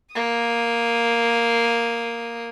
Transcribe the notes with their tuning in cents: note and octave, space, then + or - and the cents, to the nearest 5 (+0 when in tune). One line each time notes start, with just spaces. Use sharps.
A#3 +0 D#6 +0